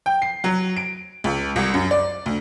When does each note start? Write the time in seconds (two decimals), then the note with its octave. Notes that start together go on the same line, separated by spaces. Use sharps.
0.06 G5
0.22 C7
0.44 F#3
0.77 D7
1.24 C#2
1.56 C2
1.74 F#2
1.91 D5
2.26 D2